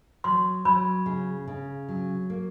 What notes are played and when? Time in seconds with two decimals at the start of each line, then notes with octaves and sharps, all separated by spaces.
0.24 F#3 C6
0.65 F#3 B5
1.06 C#3
1.48 C#3
1.89 F#3
2.30 A#3